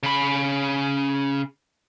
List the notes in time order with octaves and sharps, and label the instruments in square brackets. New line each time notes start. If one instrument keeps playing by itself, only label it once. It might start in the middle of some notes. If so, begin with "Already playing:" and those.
[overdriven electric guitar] C#3 B5